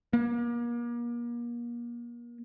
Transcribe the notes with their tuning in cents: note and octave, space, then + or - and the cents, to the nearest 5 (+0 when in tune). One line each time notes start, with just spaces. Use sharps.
A#3 +35